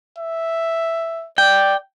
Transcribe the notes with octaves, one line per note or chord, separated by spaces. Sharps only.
E5
D5 G5